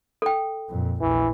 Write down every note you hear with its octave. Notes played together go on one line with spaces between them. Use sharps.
A4 G5
F2 A#2
A#1 E2 E3